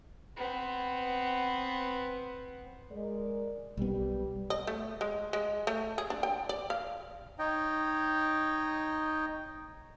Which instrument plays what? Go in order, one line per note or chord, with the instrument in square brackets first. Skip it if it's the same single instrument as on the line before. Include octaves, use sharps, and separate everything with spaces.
[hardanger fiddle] B3 C4
[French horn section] G#3 A#4 D5
[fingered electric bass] B1 B3 [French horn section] G3
[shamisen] D#5
A3
G#3
G#3
A3
G#4
D4
G5
D5
F5
[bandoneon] D#4 C#5 D#5 G5